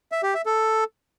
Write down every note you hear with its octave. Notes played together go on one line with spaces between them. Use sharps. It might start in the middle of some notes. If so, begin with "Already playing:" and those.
E5
G4
E5
A4